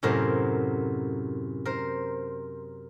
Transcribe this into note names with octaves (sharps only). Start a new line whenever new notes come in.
F#2 A2 C3 A#4 C5
A#4 C5